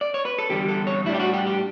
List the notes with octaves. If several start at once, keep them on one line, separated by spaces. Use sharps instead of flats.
D5
C#5
B4
A4
E2 D3 G3 G4
A4
C#5
A2 G3 D4 E4
G4
F#4
G4
G4